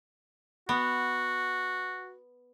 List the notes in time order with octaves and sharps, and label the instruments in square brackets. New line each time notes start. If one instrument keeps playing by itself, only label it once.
[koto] B3 [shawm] F#4